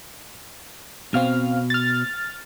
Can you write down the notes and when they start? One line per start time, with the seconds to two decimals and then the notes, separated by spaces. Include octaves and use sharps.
1.14 B2 C4 F5 F6
1.70 F6 A6